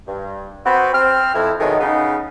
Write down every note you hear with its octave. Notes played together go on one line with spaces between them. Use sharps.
G2
B3 C4 F#4 B4
C4 F6
F2 E4
B2 D#3 F#3 G#3 A3
C#3 B3 D#4